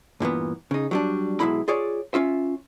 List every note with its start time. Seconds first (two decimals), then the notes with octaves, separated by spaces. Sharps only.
0.20 G2 A#2 E3 B3
0.71 C#3 D#4
0.91 F#3 G3 D4
1.40 B1 G2 F#3 G#3 E4 B5
1.68 F4 G#4 C#5 D5
2.14 C#4 F4 E5